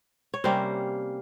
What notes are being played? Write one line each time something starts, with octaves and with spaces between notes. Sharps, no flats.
C#5
C3 G3 A#3 C#4 C5